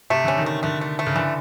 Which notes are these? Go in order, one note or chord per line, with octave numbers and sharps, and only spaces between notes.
C3 A3
D3 C#4
D#3
A3
D3 A3
A3
A3
C#3
D3 E3